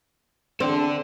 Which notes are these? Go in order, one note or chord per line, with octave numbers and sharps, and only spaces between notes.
E2 C4 D4 A4 D5